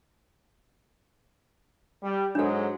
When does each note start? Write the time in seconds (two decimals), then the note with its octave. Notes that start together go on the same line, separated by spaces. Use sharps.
2.02 G3
2.35 G#2 F#3 G#3 D4 A4